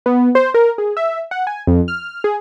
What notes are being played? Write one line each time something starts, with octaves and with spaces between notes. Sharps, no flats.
B3
C5
A#4
G#4
E5
F#5
G#5
F2
F6
G#4